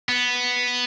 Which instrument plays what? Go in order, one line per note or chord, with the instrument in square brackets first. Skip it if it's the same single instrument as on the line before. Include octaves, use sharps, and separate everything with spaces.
[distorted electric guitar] B3